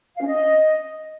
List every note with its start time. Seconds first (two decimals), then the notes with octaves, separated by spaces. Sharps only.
0.16 F5
0.21 C#4
0.27 D#5